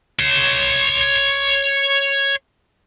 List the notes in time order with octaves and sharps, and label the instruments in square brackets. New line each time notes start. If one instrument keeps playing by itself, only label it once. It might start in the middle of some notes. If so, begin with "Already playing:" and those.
[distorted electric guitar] C#5 C6